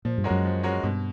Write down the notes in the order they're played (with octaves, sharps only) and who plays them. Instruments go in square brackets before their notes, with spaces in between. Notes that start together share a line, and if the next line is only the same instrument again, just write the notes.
[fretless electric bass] A#2 [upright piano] F3
[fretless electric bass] G2
[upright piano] G#3 C#4 F#4 A#4
[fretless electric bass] F#2
[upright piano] F3
G#3 C#4 F#4 A#4
[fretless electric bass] G2 [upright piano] B2